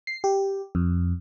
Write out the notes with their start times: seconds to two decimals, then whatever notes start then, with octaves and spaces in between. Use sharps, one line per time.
0.07 C7
0.24 G4
0.75 F2